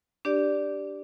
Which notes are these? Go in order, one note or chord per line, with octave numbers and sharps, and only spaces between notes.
D4 G4 D5